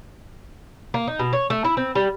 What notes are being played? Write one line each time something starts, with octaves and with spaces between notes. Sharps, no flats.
A#3
D#4
B2
C#5
A3
E4
C4
G3